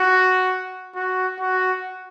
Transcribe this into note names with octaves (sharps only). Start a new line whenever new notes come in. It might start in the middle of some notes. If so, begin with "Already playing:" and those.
Already playing: F#4
F#4
F#4